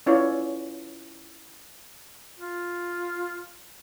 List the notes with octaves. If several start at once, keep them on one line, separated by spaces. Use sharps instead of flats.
C#4 E4 F4 B4 C#5 D5
F4